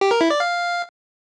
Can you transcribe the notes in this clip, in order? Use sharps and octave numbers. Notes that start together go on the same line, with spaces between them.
G4
A#4
E4
D5
F5